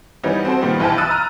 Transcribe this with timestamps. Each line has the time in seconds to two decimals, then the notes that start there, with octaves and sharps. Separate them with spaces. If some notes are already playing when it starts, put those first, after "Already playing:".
0.24 E3 G3 B3 C#4 D#4
0.45 C4 F#4 A4 C5
0.62 A#2 D#3 F3 G3 B3
0.80 B1 E3 B4 G5 A5
0.98 D#6 E6 F#6 A6 D#7
1.11 A#5 F6